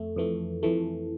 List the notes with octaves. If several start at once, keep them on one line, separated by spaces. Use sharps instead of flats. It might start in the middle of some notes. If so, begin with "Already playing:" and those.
Already playing: F2 A3
F2 E3 A3
F2 E3 A3